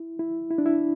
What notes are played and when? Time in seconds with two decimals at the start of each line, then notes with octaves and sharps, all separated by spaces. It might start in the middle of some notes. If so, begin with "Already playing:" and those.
Already playing: E4
0.19 E4
0.50 E4
0.58 D4
0.66 E4